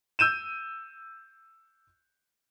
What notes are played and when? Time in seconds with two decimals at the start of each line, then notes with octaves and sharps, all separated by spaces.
0.19 E6 G6 D#7 E7